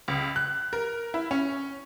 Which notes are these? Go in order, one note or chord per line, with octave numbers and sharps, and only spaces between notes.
C#2
F#6
A#4
E4
C#4